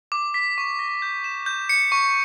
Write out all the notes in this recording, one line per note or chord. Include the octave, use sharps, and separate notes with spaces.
D6
B6
C#6
A#6
G6
E7
G6
C#7
C#6